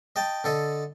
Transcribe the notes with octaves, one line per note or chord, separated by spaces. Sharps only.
D#5 G5 A5
D3 A4 D#5